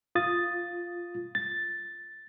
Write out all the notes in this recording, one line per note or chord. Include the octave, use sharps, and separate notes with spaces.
F4 D#6 A6
A6